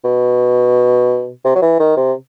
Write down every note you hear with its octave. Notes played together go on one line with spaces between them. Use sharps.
B2
C3
F#3
E3
D#3
C3